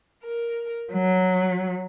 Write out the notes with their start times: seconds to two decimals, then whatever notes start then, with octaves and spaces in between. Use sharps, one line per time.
0.24 A#4
0.93 F#3